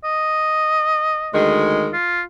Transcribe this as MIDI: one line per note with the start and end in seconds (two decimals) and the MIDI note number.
0.04 1.42 75
1.34 1.91 38
1.34 1.91 51
1.34 1.91 56
1.93 2.23 65